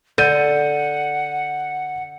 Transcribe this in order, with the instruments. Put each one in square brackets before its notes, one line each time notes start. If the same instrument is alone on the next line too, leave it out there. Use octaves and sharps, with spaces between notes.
[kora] D3 [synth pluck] A4 [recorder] F#5 [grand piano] G6 D#7